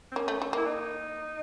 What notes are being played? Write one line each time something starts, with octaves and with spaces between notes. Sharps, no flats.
C4
A#3 C#4
A3
A3
A#3 E4
D#4